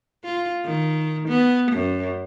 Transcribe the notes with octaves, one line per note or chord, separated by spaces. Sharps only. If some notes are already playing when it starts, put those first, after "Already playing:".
F4
D#3
B3
F#2